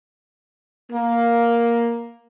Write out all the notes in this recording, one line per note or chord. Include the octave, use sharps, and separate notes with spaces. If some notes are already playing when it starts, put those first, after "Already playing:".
A#3